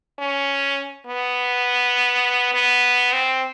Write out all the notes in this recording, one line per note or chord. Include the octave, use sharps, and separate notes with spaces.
C#4
B3
B3
C4